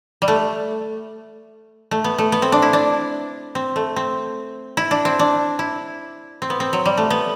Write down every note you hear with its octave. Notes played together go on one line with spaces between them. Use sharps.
G3
A3
A3
B3
A3
B3
C4
D4
E4
D4
C4
A3
C4
E4
D4
C4
D4
E4
C4
B3
C4
F#3
G3
A3
B3